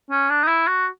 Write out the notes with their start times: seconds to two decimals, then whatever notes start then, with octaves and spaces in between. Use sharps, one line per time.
0.10 C#4
0.30 D4
0.43 D#4
0.48 E4
0.67 F#4